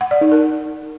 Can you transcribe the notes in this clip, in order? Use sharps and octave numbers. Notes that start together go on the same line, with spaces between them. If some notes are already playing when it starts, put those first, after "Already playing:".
F#5
D5
D#4
A#4